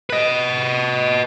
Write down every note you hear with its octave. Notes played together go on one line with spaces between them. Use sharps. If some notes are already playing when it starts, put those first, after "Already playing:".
B4 D#5